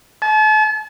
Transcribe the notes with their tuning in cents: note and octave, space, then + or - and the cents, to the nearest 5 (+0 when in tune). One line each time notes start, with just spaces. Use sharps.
A5 -40